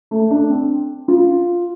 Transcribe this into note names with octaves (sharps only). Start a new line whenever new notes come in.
A3
D4
C4
F4